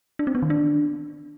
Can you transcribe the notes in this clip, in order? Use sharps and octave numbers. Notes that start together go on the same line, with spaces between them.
D4
C4
B3
D#3
D4